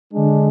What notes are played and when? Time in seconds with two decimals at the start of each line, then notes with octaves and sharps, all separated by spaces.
0.11 D3 G#3 D4